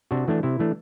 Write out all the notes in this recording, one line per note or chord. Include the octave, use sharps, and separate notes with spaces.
C3 D4 F#4
E3 A3 D4
C3 E4
E3 A3 D4